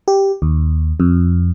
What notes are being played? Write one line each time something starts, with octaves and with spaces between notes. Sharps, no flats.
G4
D#2
F2